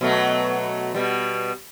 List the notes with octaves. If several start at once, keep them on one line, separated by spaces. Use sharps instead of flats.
B2 F#3 A3
B2 G3